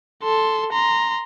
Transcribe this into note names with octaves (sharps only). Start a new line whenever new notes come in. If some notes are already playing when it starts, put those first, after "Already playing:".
A4 C6
A#5 C6